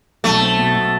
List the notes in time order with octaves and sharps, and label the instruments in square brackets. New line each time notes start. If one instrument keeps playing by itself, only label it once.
[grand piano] B1 [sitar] A3
[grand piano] C4
B2
B2